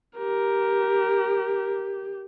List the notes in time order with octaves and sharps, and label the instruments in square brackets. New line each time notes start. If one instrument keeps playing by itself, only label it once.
[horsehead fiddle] G4 [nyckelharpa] A#4